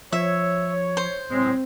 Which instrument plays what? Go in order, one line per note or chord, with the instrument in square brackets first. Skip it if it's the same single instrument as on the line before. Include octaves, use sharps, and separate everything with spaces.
[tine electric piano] F3 [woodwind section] C#5 [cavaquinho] E5
[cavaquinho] C5
[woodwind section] A2 F#3 G#3 [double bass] C4